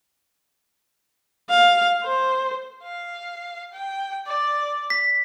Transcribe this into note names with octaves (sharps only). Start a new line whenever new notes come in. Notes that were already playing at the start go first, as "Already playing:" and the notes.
F5
C5
F5
G5
D5
B6